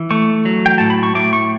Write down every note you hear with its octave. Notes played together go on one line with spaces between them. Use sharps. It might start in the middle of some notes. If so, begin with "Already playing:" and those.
Already playing: E3
A3 C#6
F#3
G5
A2 A5
B5
C#6
A2 D6
C#6